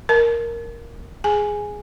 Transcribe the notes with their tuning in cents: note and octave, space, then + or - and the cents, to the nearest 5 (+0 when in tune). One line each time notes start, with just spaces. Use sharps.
A#4 +0 A5 -10
G#4 +0 G#5 +0